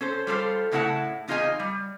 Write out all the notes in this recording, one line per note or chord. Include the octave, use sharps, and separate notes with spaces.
C#4 A4 C5
G3 F4 A4 C5
A2 C#3 A3 E4 F#5 A5
E2 D#4 F4 G#4 D#5 G#5
G3